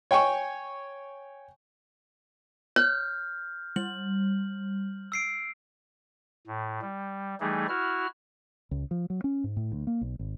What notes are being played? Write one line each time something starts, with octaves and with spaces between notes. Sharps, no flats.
C#5 G5 G#5 C#6
C#5 F6 G6
G3 F#7
E6 C7 D7
A2
G3
E3 G3 A3 D#4 G#4
E4 F#4 F6
C#2
F3
F#3
C#4
G#2
A2
D2
A#3
B1
G#1